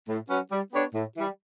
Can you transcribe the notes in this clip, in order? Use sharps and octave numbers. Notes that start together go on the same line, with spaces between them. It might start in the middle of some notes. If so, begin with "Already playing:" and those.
A2
F#3 C#4 F#4 B4
G3
B3 D4 G4 C#5
A2
E3 G3